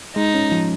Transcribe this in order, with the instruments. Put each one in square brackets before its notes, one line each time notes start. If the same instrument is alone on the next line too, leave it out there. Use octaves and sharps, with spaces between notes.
[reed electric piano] G#3 [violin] D#4
[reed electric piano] C#4
F3